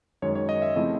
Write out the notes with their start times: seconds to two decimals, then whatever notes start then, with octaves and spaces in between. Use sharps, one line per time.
0.22 F#2 D#3 G#3 C#5
0.35 C#5
0.49 D#5
0.62 E5
0.76 C#3 F3 A3 C4 E4 D#5